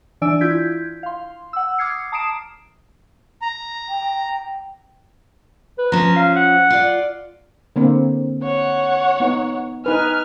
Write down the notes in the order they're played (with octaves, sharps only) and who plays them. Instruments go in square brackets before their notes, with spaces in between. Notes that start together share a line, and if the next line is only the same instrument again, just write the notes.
[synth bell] E3 D4 D5 G#5 E6 D7
E4 F4 G6 G#6 B6
F5 C6
F#5 E6
D6 D#6 F6 G#6 C7 C#7
A5 A#5 D#6 C7 D7 E7
[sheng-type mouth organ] A#5
[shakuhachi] G5
[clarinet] B4
[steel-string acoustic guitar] F3 C#4 [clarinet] A#5
[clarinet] F5
F#5
[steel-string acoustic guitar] F4 D5
[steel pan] D3 A#3 C4
[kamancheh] C#5 F#5
[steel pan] B3 D#4
[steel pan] D#4 B4 [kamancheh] G#5 F6